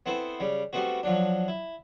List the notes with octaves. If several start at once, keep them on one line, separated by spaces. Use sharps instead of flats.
B3 C4 E4 A4 C5
C#3 G3
G3 A3 B3 C4 F#4
F3 F#3 D4
E4